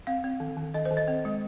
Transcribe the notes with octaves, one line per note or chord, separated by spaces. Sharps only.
C4 F5
C4
D#3
D#3
D#3 D#5
C5
D#3
D#5
C4
G#3